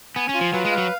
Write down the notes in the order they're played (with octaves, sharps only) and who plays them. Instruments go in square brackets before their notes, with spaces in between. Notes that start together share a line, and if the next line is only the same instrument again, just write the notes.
[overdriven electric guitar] B3 [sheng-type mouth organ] G#5
[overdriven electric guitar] C#4
[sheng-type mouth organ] F4
[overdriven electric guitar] F3
[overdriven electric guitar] F#3 [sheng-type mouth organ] B4
[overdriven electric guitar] G#3
[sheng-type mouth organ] F5
[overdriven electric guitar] F#3